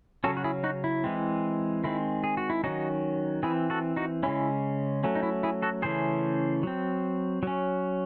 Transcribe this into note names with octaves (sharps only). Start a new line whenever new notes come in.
C#3 F#3 C#4 F#4 A4
F#4
E4 G#4
D#4 F#4
E4
E3 G#3 C4
D#3 G#3 C4 E4
G#4
F#4
E4
D#3 F#3 C#4 D#4 F#4
E3 C4 E4 G#4
F#4 A4
D#4 F#4
C#3 G#3 C#4 E4
F#3 A3 C#4
D#4
E4
E4 G#4
F#4 A4
C#3 E3 A3 C#4 G#4 C5
F#3 C4
F#3 C#4